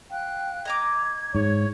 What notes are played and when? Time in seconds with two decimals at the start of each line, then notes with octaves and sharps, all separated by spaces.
0.11 F5 G5 F#6
0.65 D#5 A#5 D6 G#6
1.35 G#2 C#5